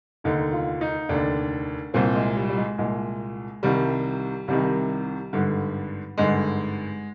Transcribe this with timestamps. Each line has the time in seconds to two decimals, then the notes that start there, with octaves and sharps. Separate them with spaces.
0.24 F1 D#2 D3 D#4
0.53 F4
0.81 D#4
1.09 F1 D#2 D3 D4
1.94 C2 A#2 C4
2.15 G#3
2.36 G3
2.49 G3
2.57 G#3
2.78 C2 A#2 G#3
3.63 C2 C3 D#3 G3
4.48 C2 C3 D#3 G3
5.33 G#1 G2 D3
6.18 G#1 G2 D3 G#3